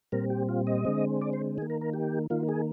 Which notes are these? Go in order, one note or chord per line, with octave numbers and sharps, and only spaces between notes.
A#2 G3 C4 A#4
G4
F4
D#5
D3 G#3 C4
D5
C5
D#3 A#3 G#4
A#4
A#4
G4
D#3 A#3 F4
G#4